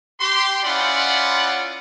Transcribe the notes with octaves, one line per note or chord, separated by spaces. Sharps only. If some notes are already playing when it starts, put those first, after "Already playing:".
G4 C6
C#4 E4 F4 D5 F#5 B5